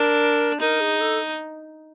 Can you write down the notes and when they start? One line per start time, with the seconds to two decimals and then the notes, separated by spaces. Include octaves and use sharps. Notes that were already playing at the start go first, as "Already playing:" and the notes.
Already playing: D4 A#4
0.60 D#4 A#4
0.80 G#4
1.00 A4